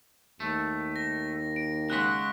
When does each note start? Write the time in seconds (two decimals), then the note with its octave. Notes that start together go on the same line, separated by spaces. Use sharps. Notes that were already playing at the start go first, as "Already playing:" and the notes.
0.40 D#2 A3
0.96 A#6
1.56 D7
1.90 C#3 G#3 F#4 F#6 B6